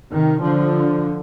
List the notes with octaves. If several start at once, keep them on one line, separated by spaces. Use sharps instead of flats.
C3 D#3
D3 F3